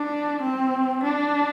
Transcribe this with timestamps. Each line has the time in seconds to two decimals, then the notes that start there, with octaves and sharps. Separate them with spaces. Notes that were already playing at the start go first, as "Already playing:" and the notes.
Already playing: D4
0.42 C4
1.03 D4